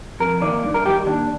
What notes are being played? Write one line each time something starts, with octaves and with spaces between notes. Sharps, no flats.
F2 A#4
D#3 A#3 D5
G2
A#4
D#3 G3 G4
D#2 D4